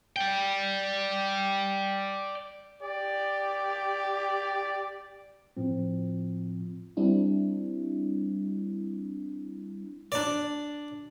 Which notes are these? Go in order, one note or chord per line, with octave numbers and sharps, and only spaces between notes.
D5 G5
G4 D5
A2 F3 C4
G3 C4 D4 E4
D4 D5